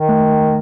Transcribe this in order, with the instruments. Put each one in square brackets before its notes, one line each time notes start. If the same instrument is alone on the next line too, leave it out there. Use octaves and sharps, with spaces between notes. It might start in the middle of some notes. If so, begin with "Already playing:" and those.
Already playing: [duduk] D#3
[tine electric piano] A3